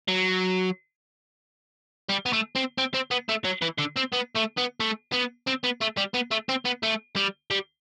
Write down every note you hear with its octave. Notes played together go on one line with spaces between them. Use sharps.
F#3
G3
B3
A3
C4
C4
C4
B3
A3
F#3
E3
D3
C4
B3
A3
B3
A3
B3
C4
B3
A3
G3
B3
A3
C4
B3
A3
G3
G3